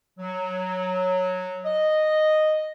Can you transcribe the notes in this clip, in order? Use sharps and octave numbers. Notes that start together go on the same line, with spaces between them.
F#3
D#5